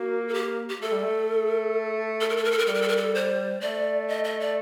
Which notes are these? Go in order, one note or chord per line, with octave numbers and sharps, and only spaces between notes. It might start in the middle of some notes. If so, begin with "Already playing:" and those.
Already playing: A#3 F#4
A4
G4
G4
A3 A4
G3
A3
A4
A#4
A4
A#4
A4
A#4
G3 A4
A#4
A4
A#4
A4
C5
A3 D5
D#5
D#5
D5